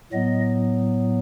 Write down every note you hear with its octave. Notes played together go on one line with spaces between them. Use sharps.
A2 F#3 B3 D#5